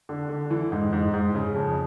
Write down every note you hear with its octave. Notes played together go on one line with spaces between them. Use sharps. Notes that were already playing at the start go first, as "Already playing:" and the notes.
D3
D3
E3
G#2
G#2
G#2
C#3
F2